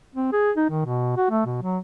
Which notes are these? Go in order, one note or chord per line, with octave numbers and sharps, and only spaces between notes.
C4
G#4
D#4
D#3
B2
F#4
A3
B2
F#3